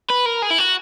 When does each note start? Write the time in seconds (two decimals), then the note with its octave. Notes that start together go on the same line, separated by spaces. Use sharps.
0.10 B4
0.26 A#4
0.43 G#4
0.51 E4
0.59 F#4